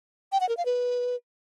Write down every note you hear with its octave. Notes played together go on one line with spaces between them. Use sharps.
G5
F#5
A#4
F5
B4